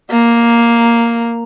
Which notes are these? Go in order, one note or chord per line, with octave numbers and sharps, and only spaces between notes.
A#3